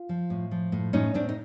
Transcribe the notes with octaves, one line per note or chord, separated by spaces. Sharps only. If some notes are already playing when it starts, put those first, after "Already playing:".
Already playing: F4
F3
A2
F3
A2
A2 C#4 D#4
A2 C4 D4
D#4